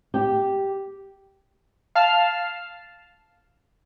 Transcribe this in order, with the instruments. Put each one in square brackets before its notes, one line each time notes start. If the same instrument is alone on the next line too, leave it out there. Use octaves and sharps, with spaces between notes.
[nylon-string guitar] G4
[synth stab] F5 A5 F6 C7